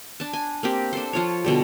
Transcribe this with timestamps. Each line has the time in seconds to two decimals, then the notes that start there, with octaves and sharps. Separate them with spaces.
0.20 D4 A5
0.33 G#5
0.63 A#3 C4 G4
0.93 D4 A4 C5
1.13 F3 F4 C#5
1.45 B2 D3 G3